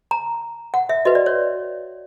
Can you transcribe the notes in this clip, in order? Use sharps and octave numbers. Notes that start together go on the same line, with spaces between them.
A#5
F#5
E5
F#4 B4 D#5
D5
C#5